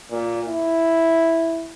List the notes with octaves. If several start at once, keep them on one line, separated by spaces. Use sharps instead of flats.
A#2
E4